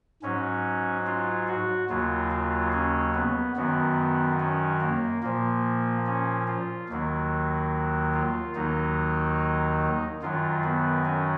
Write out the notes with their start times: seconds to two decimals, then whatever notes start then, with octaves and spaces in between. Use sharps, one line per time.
0.22 G#2 F#3 C#4
1.07 F4
1.48 F#4
1.90 D#2 C#3 F#3 F4
2.31 F4
2.73 C#4
3.15 B3
3.56 F#2 D#3 F#3 B3
4.40 C#4
4.81 A#3
5.22 A#2 F3 A#3
6.06 C#4
6.47 F4
6.89 D#2 D#3 F#3
8.14 F4
8.55 D#2 D#3 F#3 D#4
10.22 F#2 D#3 F#3 F4
10.64 B3
11.05 C#4